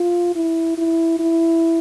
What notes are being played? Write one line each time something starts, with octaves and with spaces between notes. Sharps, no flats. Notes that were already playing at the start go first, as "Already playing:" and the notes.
Already playing: F4
E4
E4
E4